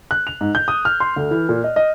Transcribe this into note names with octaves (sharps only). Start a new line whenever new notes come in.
F#6
F7
G#2
G6
D#6
F6
C6
D2
E3
A#2
D#5
D#5